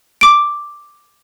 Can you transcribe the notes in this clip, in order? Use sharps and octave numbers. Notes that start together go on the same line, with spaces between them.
D6 D7